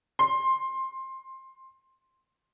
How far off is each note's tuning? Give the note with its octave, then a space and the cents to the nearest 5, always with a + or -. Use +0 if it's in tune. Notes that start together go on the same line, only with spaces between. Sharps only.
C6 +10